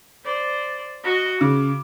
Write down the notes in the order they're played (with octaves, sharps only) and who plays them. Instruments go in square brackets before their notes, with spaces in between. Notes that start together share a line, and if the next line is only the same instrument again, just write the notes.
[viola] C5 D5
F#4 D#5
[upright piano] C#3 [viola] D6